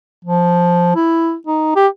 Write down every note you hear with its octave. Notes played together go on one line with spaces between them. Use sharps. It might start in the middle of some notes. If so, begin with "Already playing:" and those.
F3
E4
D#4
G4